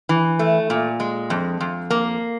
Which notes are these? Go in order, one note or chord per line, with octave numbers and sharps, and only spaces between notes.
E3
A3
A#2
G#3
F2
F2
A#3